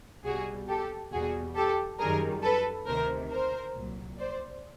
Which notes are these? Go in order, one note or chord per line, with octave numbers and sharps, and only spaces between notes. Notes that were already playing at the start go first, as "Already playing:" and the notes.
C2 B2 G3 F#4 G#4
G4 A4
E2 B2 G3 F#4 G#4
G4 A4
F#2 D#3 G3 G#4 A#4
A4 B4
D2 C3 D#3 A#4 C5
A#4 C5
C2 A#2 F#3
C5 D5